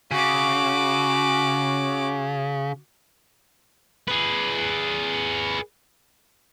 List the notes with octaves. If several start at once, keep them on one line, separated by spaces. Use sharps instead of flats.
C#3 F#4 D6
G#4 B4